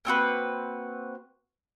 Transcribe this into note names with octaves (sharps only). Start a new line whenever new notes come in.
A#3 C4 F#4 B4